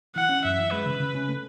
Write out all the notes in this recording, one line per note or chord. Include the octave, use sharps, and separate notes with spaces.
E3 F#5
C#4
F#2 E5
E3
G#3 B4
C#3
C#3
C#4
A3